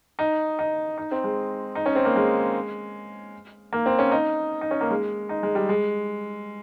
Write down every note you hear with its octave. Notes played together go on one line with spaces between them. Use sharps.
D#4
D#4
D#4
C4
G#3
D#4
C#4
C4
A#3
G#3
A#3
C4
C#4
D#4
D#4
C#4
A#3
G#3
D#4
G#3
G3
G#3